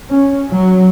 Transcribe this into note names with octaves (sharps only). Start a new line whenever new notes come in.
C#4
F#3